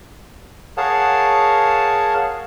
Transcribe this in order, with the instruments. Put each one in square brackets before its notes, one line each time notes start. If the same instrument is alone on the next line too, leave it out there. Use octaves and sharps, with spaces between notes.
[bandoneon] G#4 A#4 C#5 F5 F#5 A5